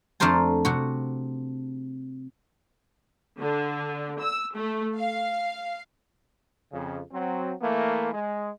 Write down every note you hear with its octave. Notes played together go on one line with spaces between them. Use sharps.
F2 A3 D4 A#4 C5 A5
C3 F#4
D3
E6
A3
F5
F2 C#3
F#3 C4
E3 A3 A#3
G#3